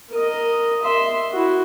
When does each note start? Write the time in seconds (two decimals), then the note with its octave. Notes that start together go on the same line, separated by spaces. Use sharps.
0.10 A#4 D#5
0.83 E5 C6
1.32 E4 F#4